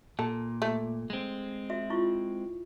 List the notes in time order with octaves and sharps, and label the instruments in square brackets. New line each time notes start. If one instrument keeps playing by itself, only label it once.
[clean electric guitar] A#2 [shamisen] A4
[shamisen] A3
[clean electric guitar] G#3 C4
[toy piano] F#4 E5
E4 F4 C#6